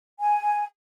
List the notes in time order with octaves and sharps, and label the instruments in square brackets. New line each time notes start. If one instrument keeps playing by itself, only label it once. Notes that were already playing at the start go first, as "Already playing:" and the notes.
[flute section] G#5